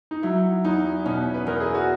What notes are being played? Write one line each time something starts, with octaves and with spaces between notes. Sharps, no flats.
D#4
F#3 E4
E2 D#4
B2 C#4
B4
E2 A#4
G#4
F#4